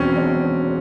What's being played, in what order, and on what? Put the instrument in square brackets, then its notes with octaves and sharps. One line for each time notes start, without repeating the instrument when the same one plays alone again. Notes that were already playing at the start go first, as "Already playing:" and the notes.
Already playing: [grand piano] E1 E2 B2 F#3 [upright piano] C4 C#4
[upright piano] D4